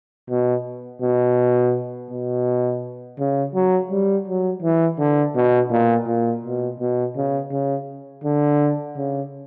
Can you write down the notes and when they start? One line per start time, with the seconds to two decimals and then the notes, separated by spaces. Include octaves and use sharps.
0.30 B2
1.02 B2
2.11 B2
3.19 C#3
3.55 F#3
3.91 G3
4.28 F#3
4.62 E3
4.99 D3
5.36 B2
5.71 A#2
6.07 A#2
6.44 B2
6.80 B2
7.17 C#3
7.52 C#3
8.24 D3
8.97 C#3